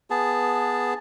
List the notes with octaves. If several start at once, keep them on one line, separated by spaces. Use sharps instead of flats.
B3 G#4 A5